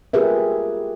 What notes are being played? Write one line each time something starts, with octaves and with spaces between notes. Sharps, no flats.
F4 G4 G#4 A#4 B4 E5